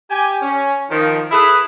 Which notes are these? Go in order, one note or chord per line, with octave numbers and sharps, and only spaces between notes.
G4 G#5
C#4
D#3 F3
E4 G#4 A4 B4